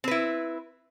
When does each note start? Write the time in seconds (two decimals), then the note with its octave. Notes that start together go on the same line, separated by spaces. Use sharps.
0.04 C4
0.08 B4
0.11 E4